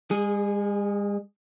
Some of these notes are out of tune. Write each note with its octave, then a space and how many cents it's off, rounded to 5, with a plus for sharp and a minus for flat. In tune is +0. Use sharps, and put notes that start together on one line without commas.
G#3 -45 G#4 +0